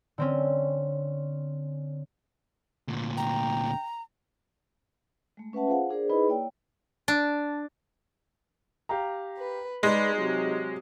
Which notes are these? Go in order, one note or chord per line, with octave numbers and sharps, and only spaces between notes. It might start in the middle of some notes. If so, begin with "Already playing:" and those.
D3 C4 C#4
D2 A#2
G5 A#5
G#3 A3
C#4 B4 E5 F#5 A5
F4 G#4 C5 F5 F#5
D4 G#4 A#4 C5 D5
D#4 E4 G#4 B4 D#5 B5
A#3 E4 C#5 D5 G5
D4
G4 F5 A#5
B4
G#3 D#4 B4 D5 C6
C3 F#3